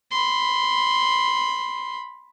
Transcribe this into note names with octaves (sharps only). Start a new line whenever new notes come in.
B5 C6